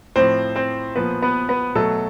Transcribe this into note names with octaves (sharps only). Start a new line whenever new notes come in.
A2 F3 C4 C5
C4 C5
A#2 F3 B3 B4
B3 B4
B3 B4
B2 F#3 A3 A4